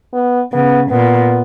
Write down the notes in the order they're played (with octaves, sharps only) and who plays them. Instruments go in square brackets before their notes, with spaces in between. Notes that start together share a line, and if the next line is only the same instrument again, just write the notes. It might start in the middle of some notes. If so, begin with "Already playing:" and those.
[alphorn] B3
[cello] C#3 [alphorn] B3
[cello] A#2 [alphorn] B3